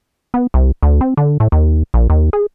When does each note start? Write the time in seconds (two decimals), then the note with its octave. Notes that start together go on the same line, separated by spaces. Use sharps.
0.34 B3
0.54 C2
0.83 D2
1.01 C4
1.17 D3
1.40 A2
1.52 D#2
1.94 A#1
2.10 D#2
2.33 G#4